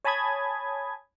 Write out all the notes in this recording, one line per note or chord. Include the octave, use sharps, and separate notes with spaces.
C#5 G#5 A5 B5 D#6 G#6